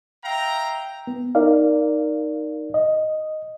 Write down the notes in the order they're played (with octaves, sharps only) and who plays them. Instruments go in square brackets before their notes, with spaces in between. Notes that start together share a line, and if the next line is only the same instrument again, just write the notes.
[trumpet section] E5 F5 G5 A#5
[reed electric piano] B3
D#4 A#4 D5 F5
D#5